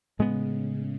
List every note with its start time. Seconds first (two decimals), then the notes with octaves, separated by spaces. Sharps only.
0.19 A2 C#3 G#3 B3